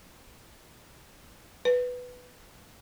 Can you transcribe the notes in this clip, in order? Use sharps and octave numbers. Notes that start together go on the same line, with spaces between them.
B4